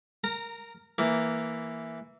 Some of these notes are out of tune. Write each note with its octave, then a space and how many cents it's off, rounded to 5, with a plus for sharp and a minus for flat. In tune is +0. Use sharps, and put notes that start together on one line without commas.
A#4 +0 A#5 -25
E3 +0 A#3 -5